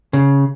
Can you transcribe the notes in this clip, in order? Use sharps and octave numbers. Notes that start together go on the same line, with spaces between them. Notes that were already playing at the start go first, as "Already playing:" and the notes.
C#3